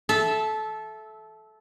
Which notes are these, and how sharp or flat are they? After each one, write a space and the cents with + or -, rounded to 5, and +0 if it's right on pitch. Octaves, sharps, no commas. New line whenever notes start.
A4 -20 E5 +0